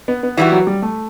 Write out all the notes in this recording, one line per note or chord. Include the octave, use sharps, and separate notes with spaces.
B3
B3
E3 G3 B3 D#4 E4 F#4
F#3
G3
A3